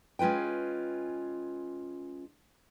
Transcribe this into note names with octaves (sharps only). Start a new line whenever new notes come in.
G#3 C#4 F4 B4 G5